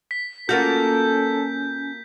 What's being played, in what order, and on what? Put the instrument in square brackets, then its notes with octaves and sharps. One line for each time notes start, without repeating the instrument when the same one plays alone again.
[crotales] B6
[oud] A#3 F4 F#4 [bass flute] C#4 [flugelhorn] A4 [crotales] G6